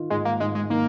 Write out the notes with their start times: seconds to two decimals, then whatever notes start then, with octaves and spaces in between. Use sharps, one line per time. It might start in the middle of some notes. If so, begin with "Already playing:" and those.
Already playing: D#3 F4
0.10 G#2 G#3
0.25 A#3
0.40 G#2 G#3
0.55 G#3
0.70 D#3 A#3